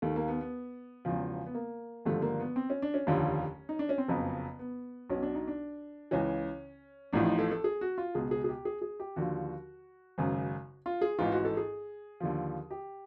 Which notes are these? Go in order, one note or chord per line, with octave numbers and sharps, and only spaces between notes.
D#2 D#3 A3
A#3
B3
B3
E1 E2 C#3 F3
B3
A#3
G#1 G2 D3 F3 A3
A#3
B3
C4
C#4
D4
C#4
F1 D#2 D3 F3
D#4
D4
C#4
C4
F#1 F2 C#3 B3
B3
B1 B2 C#4
D4
D#4
D4
C#2 C#3 E3 C#4
A1 A2 F3 D4
D#4
A4
A4
G#4
F#4
F4
C#2 B2 G#4
G#4
G#4
G4
G#4
G#4
G4
D#2 D3 F3 F#4
G#1 F#2 C#3
F4
G#4
A1 G#2 E3 F4
F#4
A4
G#4
D#2 D3 F3
G4